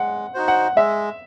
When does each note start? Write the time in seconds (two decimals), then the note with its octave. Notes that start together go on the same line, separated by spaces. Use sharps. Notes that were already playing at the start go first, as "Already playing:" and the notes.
Already playing: G#3 F#5
0.34 D#4 F#4 C5
0.48 F#5
0.76 G#3 E5